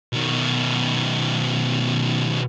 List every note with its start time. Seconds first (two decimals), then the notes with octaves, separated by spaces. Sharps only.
0.13 B2 D#3